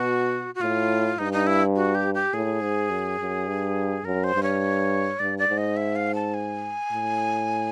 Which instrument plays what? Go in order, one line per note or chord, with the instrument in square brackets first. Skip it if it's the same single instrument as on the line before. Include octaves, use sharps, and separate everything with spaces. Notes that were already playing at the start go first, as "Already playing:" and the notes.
Already playing: [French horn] B2 [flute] F#4
[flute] F#4
[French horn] A2 [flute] F4
[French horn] G2 [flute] D#4
[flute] D#4
E4
F#4
G4
G4
[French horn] A2 [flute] G#4
[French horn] G#2
F#2
F#2
G2
[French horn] F#2 [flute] A#4
[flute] C5
[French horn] G2
[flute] C#5
[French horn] G2 [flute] D5
[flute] D5
[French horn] G#2
[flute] D#5
E5
F5
A5
G#5
[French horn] A2